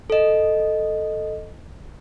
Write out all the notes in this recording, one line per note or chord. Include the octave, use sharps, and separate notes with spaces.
A4 D#5